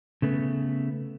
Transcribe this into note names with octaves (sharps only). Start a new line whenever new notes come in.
C#3 A3 B3